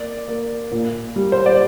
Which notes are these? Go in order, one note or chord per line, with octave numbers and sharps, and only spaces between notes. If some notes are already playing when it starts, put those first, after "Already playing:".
Already playing: A#3 D5
A#3
A#2
G3
C5
D5